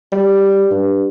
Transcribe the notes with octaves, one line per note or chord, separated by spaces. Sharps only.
G3
G2